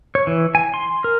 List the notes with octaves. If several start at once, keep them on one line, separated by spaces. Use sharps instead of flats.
C#5
E3
G#5
C6
A#4